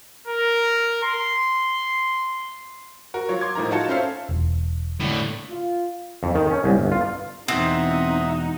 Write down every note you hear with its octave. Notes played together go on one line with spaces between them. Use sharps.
A#4
C6
F#4 A#4
F#3 F4 C#5
C6 D6 G#6
A2 F3 D#4 A#4 A#5
D#4 F4 F#4 A5 C#7
C#4 F4 A4 C5 E5 F5
E1
A2 D3
F4
F2
D#3
C#4
C2
G1
F4
E2 B2 C4 D#4 E5 F#5 D#6